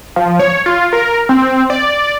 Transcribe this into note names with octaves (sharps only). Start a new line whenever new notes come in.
F3
C#5
F4
A#4
C4
D5